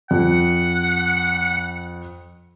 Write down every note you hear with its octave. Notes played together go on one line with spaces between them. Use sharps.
F2 F#5